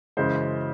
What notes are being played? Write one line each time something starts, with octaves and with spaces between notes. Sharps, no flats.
F#2 C#3 E3 G#3 C5